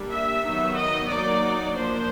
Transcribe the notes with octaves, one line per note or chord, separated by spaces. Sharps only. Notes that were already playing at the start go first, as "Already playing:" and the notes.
Already playing: G3 A#3 D4
E5
D#3 F#3 B3 D#4
D#5
F#3 A#3 D#4 D5
F3 A#3 D4 C5